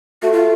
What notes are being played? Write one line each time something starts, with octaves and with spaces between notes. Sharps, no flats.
A3 F#4
F4